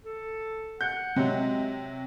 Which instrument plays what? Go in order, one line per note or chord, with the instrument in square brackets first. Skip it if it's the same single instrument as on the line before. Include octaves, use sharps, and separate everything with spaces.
[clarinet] A4
[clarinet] F#5 [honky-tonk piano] G6
[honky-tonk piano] C3 F#3 [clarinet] G#3